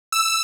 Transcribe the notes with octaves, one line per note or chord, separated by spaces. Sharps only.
E6